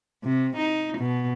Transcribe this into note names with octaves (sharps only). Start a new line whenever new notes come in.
C3
D#4
B2